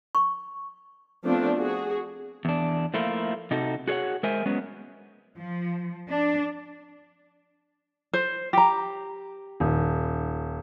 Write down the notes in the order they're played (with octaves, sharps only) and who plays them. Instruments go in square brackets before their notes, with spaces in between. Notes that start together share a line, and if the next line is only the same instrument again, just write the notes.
[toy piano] C#6
[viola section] F3 A3 B3 C4 D4
F#4 G#4
[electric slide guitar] E2 D4
F3 A3 A#3 E4 F4
C3 D#4 F#4 A4
F#4 G#4 C5 C#5 F#5
G#3 A#4 C5 E5 G#5
F#3 G#3 B3 C#4
[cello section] F3
D4
[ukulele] C5
G4 A#5
[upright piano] D#1